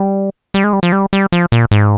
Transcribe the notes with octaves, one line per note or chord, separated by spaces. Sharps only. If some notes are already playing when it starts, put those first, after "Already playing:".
Already playing: G3
G3
G#3
G3
F3
G3
G3
F3
A#2
G#2